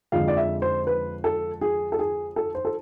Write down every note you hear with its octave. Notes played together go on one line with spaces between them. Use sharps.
F2 D3 F3 G#3 F5
D5
E5
C5
B4
A4
G#4
A4
G#4
A4
C5
A4